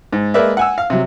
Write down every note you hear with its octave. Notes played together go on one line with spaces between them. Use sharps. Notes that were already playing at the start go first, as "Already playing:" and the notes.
G#2
G#3 A#3 A#4 B4 D5 E5
F#5 G#5 E6
F5
C3 F#3